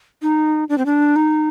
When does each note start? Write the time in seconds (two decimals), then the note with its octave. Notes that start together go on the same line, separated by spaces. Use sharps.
0.22 D#4
0.69 D4
0.78 C4
0.86 D4
1.16 D#4